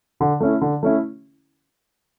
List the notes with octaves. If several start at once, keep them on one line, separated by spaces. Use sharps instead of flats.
D3
A3 C#4 E4
D3
A3 C#4 E4